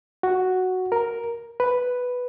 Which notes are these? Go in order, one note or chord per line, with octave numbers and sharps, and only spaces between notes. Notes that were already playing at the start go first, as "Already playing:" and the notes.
F#4
A#4
B4